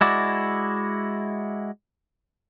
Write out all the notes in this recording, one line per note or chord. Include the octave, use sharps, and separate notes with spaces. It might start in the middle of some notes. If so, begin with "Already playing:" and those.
G#3 E4 F#4 D5